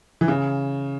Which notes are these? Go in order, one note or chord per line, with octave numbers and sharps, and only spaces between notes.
E3
C#3